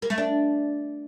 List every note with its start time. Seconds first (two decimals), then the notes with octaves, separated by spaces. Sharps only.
0.02 A#3
0.10 A3
0.18 D4